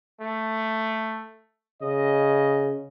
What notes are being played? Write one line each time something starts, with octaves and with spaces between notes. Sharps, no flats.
A3
C#3 D#5